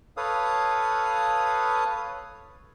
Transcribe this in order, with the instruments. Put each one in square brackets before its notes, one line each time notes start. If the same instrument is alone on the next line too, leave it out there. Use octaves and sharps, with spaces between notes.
[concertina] A4 B4 C#5 F5 D#6